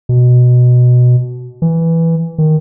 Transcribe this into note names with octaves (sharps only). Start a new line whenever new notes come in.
B2
E3
D#3